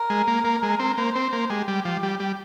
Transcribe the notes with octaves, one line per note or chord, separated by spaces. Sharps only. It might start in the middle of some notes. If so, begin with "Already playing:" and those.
Already playing: A#4
G#3
A#3
A#3
G#3
C4
A#3 C5
C4
A#3
G#3 G4
G3
F3
G3
G3